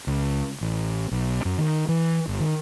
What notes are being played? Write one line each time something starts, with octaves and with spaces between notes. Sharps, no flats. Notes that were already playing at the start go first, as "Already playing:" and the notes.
C#2
A1
B1
F#2
D#3
E3
G1
D#3